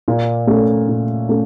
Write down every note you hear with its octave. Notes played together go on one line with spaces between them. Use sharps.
A#2
A3 C#4 A4
A#2
A3 C#4 A4